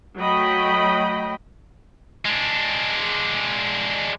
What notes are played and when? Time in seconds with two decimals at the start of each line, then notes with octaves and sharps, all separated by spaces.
0.18 F#3 A3 D#5 G5 B5
2.25 G#3 D4